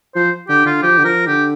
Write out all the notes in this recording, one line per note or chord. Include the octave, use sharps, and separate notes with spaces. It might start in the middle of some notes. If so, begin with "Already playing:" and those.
F3 C5
D3 G4
D3 F4
F3 G4
D3
F3 A#4
D3 G4